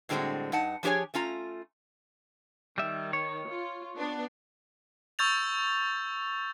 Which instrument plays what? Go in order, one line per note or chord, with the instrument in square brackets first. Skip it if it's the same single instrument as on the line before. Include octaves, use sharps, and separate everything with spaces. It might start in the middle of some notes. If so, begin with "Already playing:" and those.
[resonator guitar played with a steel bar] A2 D3 G3 G#3 C4 F#4
G2 D#4 F#5 A5
F3 D4 G4 G#4 C#5 G#5
A3 C#4 F4 A#5
[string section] D#3 [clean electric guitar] G3 E5
[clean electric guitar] C#5
[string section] F4
B3 D4
[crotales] C#6 E6 G6 A6 F7